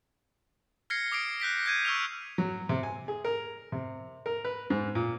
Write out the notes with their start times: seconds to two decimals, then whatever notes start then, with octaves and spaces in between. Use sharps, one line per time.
0.90 F6 G#6 A#6 C7 C#7
1.12 D6 D#6 C7 D7
1.40 F#6 G6 B6 D7
1.66 G6 G#6 D#7
1.85 C#6 E6 F6 F7
2.38 F#3
2.69 C3
2.83 G#5
3.08 G#4
3.25 A#4
3.72 C3
4.26 A#4
4.45 B4
4.70 G#2
4.95 A#2